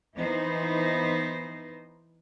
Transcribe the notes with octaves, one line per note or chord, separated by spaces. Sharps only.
E3 B3 D#4 C5